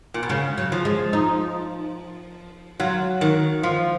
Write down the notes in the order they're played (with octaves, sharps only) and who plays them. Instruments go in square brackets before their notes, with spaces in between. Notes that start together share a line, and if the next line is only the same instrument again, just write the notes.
[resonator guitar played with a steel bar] A#2
B2
[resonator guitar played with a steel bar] C#3 [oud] C#4
[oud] F#3
[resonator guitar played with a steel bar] F3
[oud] G#3
D#4
[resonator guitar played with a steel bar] F#3 [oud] F4
[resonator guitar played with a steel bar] D#3 [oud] F#4
[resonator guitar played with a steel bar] F3 [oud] F4